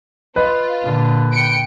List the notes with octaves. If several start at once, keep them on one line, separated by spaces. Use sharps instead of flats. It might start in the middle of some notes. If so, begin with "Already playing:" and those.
F4 B4 D#5
A#2 D3
G5 C#7 D7